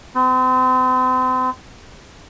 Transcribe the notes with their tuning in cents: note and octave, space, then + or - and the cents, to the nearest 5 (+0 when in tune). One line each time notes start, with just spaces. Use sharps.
C4 -40